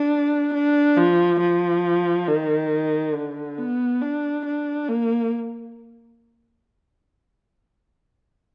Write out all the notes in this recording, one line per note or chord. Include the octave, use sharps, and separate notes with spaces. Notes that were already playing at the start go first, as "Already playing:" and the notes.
Already playing: D4
D4
F3
F3
D#3
D3
B3
D4
D4
A#3